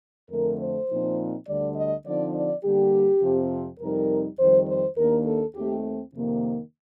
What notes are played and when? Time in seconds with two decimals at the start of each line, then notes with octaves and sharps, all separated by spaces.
0.31 F2 D3 A3 A#4
0.60 C5
0.89 A#2 F3 C4 D#4
1.47 D2 D3 G3 D5
1.76 D#5
2.06 D3 F3 C4 D#4 D5
2.35 D5
2.64 D3 G3 A#3 G4
3.22 F2 C3 F3 C4
3.80 F2 C3 G3 C4 D#4 A#4
4.38 F2 D#3 G3 C5
4.67 C5
4.96 D#2 D#3 A#3 D4 A#4
5.25 A4
5.55 D#2 D#3 A3 C4 G4
6.13 F2 C3 D#3 A#3